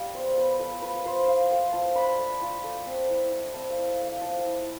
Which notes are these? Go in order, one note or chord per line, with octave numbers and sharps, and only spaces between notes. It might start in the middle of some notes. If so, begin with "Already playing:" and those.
Already playing: G3 F4 F5
B3 C5
B3 B4
F4 A4
F4 B4
F4 C5
F4 F5
A3 G5
F4 A5
D4 B5
A3
F4
A3
C4
E4
E4
C4 A5
F5
A3
E5
A3 F5
F3 A5
G5
E4